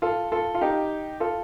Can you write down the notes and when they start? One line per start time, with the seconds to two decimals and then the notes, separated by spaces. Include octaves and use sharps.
0.02 F4 A4
0.32 F4 A4
0.54 F4
0.61 D#4 G4
1.20 F4 A4